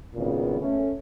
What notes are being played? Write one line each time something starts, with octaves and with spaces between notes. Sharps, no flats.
G#1 A#2 C#3 B3
A3 C#4